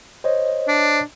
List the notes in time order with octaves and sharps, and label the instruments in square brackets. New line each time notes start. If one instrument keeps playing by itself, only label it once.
[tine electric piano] C5 C#5 D#5
[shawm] D4